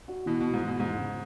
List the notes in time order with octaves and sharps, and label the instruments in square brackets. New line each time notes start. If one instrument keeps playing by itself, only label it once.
[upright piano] F#4
[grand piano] B2 [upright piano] E3
[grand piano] B2 [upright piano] E3
[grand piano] G#2
[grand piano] B2 [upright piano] E3
[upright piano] E2 [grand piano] G#2
[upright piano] C#3